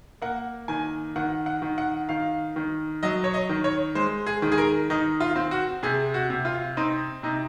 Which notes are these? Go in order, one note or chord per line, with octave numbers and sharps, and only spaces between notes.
A#3 F#5
D#3 G#5
D#3 F#5
F#5
D#3
F#5
D#3 F5
D#3
F#3 D#5
C#5
D#5
D#3
C#5
G#3 C5
G#4
D#3
G#4
A#4
D#3 D#4
F4
C4
F#4
C3 G#4
F#4
C3
F4
C4 D#4
C3 D#4